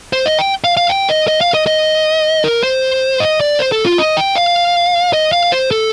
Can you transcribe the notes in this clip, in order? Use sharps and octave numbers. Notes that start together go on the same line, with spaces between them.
C5
D#5
G5
F5
F5
G5
D#5
D#5
F5
D#5
D#5
A#4
C5
D#5
D5
C5
A4
F4
D#5
G5
F5
D#5
F5
C5
A4